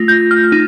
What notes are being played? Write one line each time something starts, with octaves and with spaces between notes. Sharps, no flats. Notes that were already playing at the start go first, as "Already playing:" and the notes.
Already playing: A3 F4 A#6
G6
F6
D#4